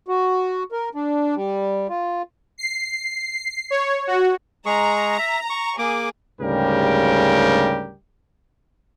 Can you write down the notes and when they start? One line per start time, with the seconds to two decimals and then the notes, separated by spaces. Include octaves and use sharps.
0.08 F#4
0.72 A#4
0.95 D4
1.35 G3
1.89 F4
2.58 C7
3.70 C#5
4.07 F#4
4.66 G#3 G#4 A#5 C#6
5.19 E5
5.50 C#6
5.79 A#3 G#4 D6
6.41 D2 G#2 C#3 G3 G4 A#4